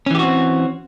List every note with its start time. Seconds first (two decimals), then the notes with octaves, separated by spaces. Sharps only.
0.06 C#4
0.11 E3
0.15 G4
0.19 F#4
0.23 C4